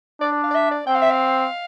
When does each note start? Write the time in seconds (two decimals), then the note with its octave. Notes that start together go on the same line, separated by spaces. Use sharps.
0.21 D4 D5
0.32 D5
0.44 F5
0.51 D5
0.55 E5
0.71 D5
0.87 C4 G5
0.95 F5
1.02 E5
1.11 F5